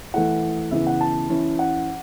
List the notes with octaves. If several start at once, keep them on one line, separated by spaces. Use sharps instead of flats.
E3 A3 E4 F#5
C#3 E3 B3 E4 E5
F#5
A5
E3 C#4 E4
F#5